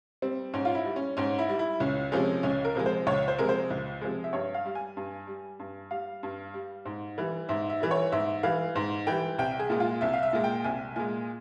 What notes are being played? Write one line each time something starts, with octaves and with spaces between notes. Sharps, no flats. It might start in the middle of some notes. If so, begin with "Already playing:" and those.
G3 C4
G#2 C#4
F4
E4
G3
C#4
G#2 C#4
E4
G3
E4
C#2 C#4
C3 F3 G#3 C#4
C#2 C#4
A#4
C3 F3 G#3
C5
C#2 C#5
C5
C3 F3 G#3 A#4
C5
C#2
C3 F3 G#3
E5
G2 C#5
F5
G3
G#5
G2
G3
G2
G3 F5
G2
G3
G#2
E3 G3
G#2 E5
E5
E3 G3
C#5
G#2 E5
E3 G3 F5
G#2
E3 G3 G5
C2 G5
G#4
A#2 G#3
F4
C2 E5
F5
E5
A#2 G#3
G5
C2 G#5
A#2 G#3 G#5